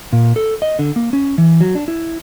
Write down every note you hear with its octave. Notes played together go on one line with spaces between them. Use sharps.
A#2
A4
D#5
D3
A#3
C#4
E3
F#3
D4
E4